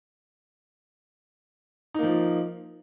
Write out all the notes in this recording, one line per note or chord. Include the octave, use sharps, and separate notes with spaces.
F3 A#3 D#4